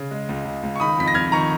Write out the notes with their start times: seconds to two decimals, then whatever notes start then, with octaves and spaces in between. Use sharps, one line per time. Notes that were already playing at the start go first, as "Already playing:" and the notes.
Already playing: C#3
0.11 G#3
0.29 C#2
0.45 C#2
0.63 C#2
0.76 C#6
0.80 D#3 B5 D#6
0.98 F2 B6
1.08 A#6
1.15 F2 F6 G#6
1.32 D#3 A#5 C#6